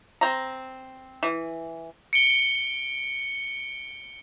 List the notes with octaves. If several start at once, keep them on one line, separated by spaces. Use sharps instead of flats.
C4 A#5
E3
C#7 D7 G7